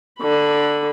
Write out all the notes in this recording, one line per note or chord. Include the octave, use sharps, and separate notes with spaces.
D3 B5